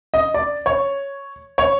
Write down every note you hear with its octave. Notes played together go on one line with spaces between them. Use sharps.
D#5
D5
C#5
C#5